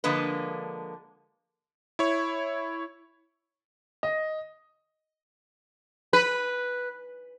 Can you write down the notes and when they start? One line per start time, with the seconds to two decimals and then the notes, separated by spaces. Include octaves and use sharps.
0.04 D3 F3 G#3 A#3 B4
1.99 E4 C#5
4.03 D#5
6.13 B4